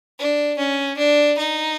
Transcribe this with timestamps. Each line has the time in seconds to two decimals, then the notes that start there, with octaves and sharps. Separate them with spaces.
0.19 D4
0.58 C#4
0.98 D4
1.38 D#4